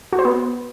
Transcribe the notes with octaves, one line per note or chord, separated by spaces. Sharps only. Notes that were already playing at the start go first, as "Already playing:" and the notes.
F#4
C5
B3